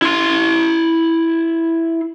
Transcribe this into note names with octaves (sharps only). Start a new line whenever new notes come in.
E4 C6